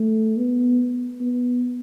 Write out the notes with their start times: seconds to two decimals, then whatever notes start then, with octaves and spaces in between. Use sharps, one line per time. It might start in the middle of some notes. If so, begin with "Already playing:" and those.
Already playing: A3
0.37 B3
1.21 B3